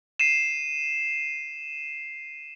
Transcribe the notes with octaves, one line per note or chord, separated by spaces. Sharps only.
C7 D#7 E7